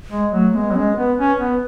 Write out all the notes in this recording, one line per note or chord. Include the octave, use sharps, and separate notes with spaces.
G#3
F#3 A3
G#3 B3
F#3
G#3 C#4
B3 B4
C#4
B3